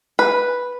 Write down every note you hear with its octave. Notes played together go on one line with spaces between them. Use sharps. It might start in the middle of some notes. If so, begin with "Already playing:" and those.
B4